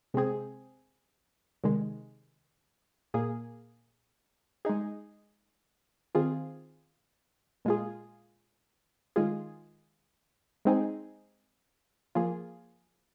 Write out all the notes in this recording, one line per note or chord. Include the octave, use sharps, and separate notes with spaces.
C3 G#3 C4 G#4
C3 D#3 G#3
A#2 A#3 G#4
G#3 D#4 G#4
D#3 C4 F4 G#4
A#2 G#3 F4 G#4
D#3 G#3 F4 G#4
G#3 C4 D#4 G#4
F3 A#3 F4 G#4